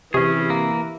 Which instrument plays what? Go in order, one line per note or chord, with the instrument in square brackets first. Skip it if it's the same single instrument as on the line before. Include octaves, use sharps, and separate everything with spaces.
[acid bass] C3 [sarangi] E3 [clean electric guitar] C#4 G#4 [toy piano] G4
[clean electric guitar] A#3